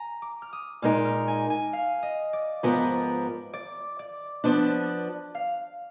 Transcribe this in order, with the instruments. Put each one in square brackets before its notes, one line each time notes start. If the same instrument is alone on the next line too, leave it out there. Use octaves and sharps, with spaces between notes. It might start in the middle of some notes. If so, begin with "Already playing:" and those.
Already playing: [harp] G#5 A#5
D6
F6
D#6
[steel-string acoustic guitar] A#2 G#3 D#4 A#4 [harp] F6
[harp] F6
G#5
G#5
F5
D#5
D5
[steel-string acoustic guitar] G#2 F3 B3 F4 A#4 [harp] B4
[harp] D5
D5
[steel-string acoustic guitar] F3 B3 D4
[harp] F5